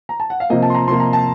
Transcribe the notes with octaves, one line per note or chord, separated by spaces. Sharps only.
A#5
A5
F#5
F5
C3 F3 A#3 D#5
A5
C6
A#5
C3 F3 A#3 C6
A#5
A5